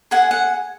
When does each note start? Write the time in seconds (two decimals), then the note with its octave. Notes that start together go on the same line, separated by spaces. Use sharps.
0.11 G#4 F#5
0.31 F#5